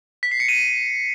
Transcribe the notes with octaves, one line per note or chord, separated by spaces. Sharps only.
B6
C7
C#7
D#7